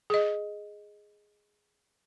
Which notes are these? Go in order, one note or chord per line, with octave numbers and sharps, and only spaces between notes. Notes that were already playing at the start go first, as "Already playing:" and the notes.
G#4 D#5